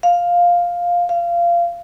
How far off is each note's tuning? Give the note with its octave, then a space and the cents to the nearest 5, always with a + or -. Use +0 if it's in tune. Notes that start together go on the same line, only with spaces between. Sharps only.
F5 +5
F5 -20